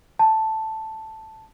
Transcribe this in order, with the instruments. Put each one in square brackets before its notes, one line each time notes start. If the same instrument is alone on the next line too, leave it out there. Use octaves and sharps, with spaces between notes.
[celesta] A5